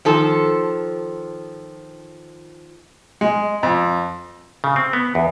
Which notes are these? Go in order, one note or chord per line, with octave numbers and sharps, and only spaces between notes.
D#3 F3 A4
G#3
F2
C#3
C4
B3
E2